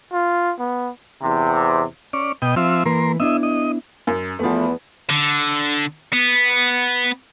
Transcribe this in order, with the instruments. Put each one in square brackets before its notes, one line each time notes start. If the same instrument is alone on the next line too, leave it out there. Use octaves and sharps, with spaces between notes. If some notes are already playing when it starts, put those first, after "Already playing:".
[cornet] F4
B3
[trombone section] E2 C3
[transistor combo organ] C#4 D5
B2 D#5 G5
F3 C4 E5
[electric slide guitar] E3 A#3 B4 [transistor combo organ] A#4 C6
[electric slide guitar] B3 D4 E4 [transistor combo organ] D#5 E5
[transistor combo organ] D#5
[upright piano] F#2
[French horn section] E2 B3 [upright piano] F3 A3
[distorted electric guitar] D3
B3